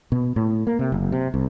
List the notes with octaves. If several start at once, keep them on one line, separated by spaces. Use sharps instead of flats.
B2
A2
A#3
C3
F#1
C3
C2